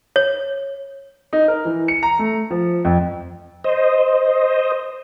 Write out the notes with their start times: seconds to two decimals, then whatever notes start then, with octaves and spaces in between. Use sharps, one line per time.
0.16 C#5
1.33 D#4
1.48 A#4
1.65 E3
1.88 C#7
2.03 A#5
2.19 A3
2.51 F3
2.85 F2
3.64 C5 D#5